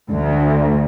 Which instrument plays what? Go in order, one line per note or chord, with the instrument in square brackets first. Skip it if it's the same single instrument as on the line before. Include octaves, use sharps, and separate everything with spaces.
[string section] D2